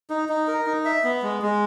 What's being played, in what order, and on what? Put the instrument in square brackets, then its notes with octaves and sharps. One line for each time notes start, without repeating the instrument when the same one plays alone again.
[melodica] D#4
D#4
A#4
D#4
E5
B3
G#3
G#3